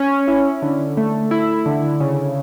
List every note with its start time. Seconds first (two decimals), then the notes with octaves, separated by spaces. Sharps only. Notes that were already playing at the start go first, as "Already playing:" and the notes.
Already playing: C#4
0.28 E4
0.62 D3
0.97 A3
1.31 E4
1.66 D3
2.00 C#3